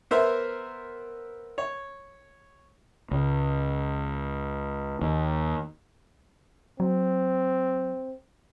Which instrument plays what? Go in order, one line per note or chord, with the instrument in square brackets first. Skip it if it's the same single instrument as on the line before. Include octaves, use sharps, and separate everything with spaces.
[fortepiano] B3 A#4 C5 E5
C#5
[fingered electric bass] C#2
D#2
[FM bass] F#3 [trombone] C4